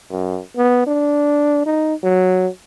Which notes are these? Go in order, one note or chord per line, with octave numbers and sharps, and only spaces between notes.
F#2
B3
D4
D#4
F#3